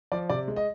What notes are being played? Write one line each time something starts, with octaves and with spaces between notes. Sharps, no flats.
F3 D5
C3 D5
G#3
D#5